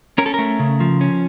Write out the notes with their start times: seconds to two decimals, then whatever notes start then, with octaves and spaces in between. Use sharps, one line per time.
0.18 C#4 A#4
0.26 A4
0.34 A3 A#4
0.59 C#3
0.80 F3
1.01 C#4